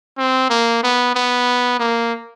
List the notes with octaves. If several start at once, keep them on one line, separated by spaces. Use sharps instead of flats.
C4
A#3
B3
B3
A#3